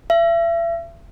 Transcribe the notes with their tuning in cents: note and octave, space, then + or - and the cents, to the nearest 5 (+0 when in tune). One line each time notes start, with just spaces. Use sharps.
E5 +35